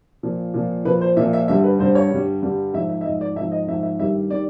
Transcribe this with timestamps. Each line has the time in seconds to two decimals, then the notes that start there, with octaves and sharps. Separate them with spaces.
0.23 A#2 F3
0.54 A#2 F3
0.85 A#2 F3 B4
1.01 C5
1.17 A#2 F3 E5
1.33 E5
1.48 G2 D3 G3 E5
1.64 B4
1.79 G2 D3 G3 C5
1.95 C#5
2.11 G2 D3 G3
2.42 G2 D3 G3
2.73 G#2 F3 E5
2.89 E5
3.01 E5
3.04 F3 D#5
3.08 G#2
3.21 D5
3.36 G#2 E5
3.41 F3
3.51 D#5
3.67 F3 E5
3.72 G#2
3.83 E5
3.99 G2 D#3 G3 E5
4.30 D#3 G3 D5